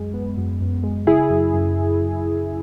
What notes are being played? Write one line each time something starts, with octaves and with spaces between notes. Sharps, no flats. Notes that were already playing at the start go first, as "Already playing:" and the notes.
Already playing: F#2 G#3
B3
F#2
F#2
G#3
C#3 E4 G#4
F#2
F#2